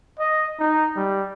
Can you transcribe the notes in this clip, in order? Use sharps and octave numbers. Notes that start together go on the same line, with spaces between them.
D#5
D#4
G3